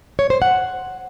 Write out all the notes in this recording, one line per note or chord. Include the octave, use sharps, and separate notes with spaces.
C#5
C5
F#5